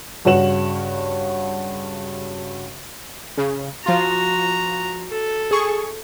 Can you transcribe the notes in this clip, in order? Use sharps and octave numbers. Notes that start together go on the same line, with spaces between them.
G2 C#3 F#4 C#5 E7 F#7
C#3
F3 F4 F#4 A#5
A4
G#4 C#6